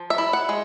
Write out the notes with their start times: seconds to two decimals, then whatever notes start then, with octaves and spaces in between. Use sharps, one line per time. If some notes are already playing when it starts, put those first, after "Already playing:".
Already playing: F3
0.10 E5
0.18 E4
0.33 F#5
0.49 G#3